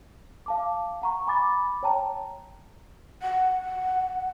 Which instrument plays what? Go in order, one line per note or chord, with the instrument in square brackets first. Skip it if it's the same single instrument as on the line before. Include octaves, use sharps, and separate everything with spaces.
[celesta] F5 A5 D6
F#5 A#5 C#6
G#5 B5 D6 A6
C#5 G5 A5 A#5
[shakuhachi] F#5